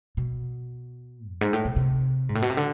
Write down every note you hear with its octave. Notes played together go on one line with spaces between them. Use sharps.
B2
F2
G#2
A2
B2
C3
G#2
A2
B2
C3
D3